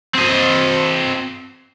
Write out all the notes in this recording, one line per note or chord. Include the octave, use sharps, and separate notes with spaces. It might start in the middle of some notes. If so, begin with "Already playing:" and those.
C4 D#5